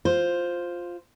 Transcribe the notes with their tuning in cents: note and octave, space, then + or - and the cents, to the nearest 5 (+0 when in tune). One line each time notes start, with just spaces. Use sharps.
F4 +5 C5 +0